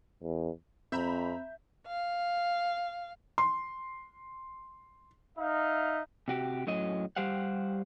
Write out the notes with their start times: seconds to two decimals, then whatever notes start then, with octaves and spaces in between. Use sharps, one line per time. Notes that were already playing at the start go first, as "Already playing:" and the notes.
0.22 E2
0.92 F2 C4 E5 A#5 B5 G6
1.86 F5
3.38 C6
5.37 D#4 E5 F5
6.28 C3 F#4 G4
6.67 F#2 A2 F#3 D#5
7.16 G3 G4 C5 F5 F#5